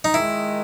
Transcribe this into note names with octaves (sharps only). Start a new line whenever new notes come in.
D#4
D#3 G#3 E4